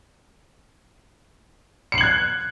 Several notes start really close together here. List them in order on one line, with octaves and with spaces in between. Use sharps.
C#7 C7 F#7 G#6 F#6